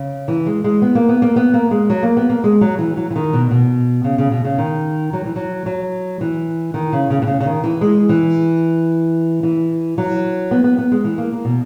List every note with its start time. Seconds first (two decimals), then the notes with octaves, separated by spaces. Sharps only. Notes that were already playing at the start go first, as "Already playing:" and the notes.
Already playing: C#3
0.28 E3
0.46 G#3
0.64 G#3
0.82 B3
0.95 A#3
1.09 B3
1.22 A#3
1.36 B3
1.54 A#3
1.71 G#3
1.90 F#3
2.03 A#3
2.17 B3
2.29 A#3
2.44 G#3
2.61 F#3
2.79 E3
2.97 F#3
3.11 E3
3.16 D#3
3.33 B2
3.51 B2
4.04 C#3
4.18 C#3
4.31 B2
4.45 C#3
4.58 D#3
5.13 F#3
5.25 E3
5.36 F#3
5.66 F#3
6.21 E3
6.74 D#3
6.93 C#3
7.10 C#3
7.22 B2
7.27 C#3
7.41 C#3
7.46 D#3
7.64 E3
7.81 G#3
8.09 E3
9.43 E3
9.98 F#3
10.51 B3
10.64 B3
10.79 B3
10.92 G#3
11.04 E3
11.18 A#3
11.32 A#3
11.45 B2